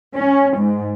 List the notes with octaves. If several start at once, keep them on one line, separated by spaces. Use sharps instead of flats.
C#4
G#2